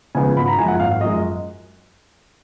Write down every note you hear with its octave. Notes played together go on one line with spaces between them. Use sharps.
C#3 F3 G#3 B3 G#5
G#1 B5
A#5
F#2 F3 G#3 G#5
F#5
G#1 F5
F#2 F3 G#3 D#5